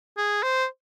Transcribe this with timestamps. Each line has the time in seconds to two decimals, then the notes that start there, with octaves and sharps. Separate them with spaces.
0.17 G#4
0.43 C5